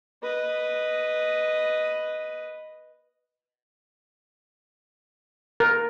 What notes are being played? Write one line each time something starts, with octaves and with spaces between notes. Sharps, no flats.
B4 D#5
A#4